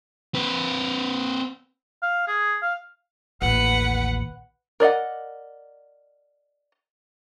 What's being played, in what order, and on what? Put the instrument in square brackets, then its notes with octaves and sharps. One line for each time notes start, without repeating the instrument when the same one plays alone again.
[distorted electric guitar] C4 B4
[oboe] F5
G#4
F5
[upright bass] A1 D#2 [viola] B4 F#5
[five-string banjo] A#4 D5 D#5 F#5